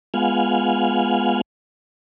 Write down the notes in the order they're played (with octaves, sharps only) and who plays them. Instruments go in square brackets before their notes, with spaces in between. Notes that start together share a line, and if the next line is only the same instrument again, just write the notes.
[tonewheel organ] G#3 B3 F4 F5 F#5 G#5